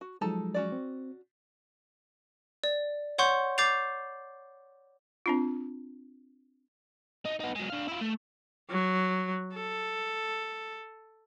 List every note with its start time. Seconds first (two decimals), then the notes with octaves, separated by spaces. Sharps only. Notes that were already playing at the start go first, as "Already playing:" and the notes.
0.01 F#4
0.21 F3 F#3 G#3 D#4 A4 A5
0.54 C#4 F#4 D5
0.72 C4
2.64 D5
3.18 C#5 F#5 C6 C#6 G6
3.58 D6 G6 A6 C7 F7
5.26 C4 D4 F4
7.26 D#4
7.40 B3 D#4
7.56 F#3 G#3
7.70 D4 F5
7.88 E4 F4
8.01 A3
8.70 F#3
9.54 A4